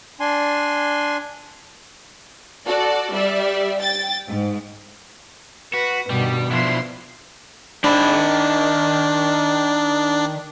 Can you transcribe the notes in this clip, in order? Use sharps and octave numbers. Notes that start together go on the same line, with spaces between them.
D4 G#5 C6
F#4 A4 D5
G3 D5 E5
G5 A6
G#2
F#4 B4
G2 B2 D#3 G3
B2 D3 F3 D4 E4 C6 B6
D#3 D4 B5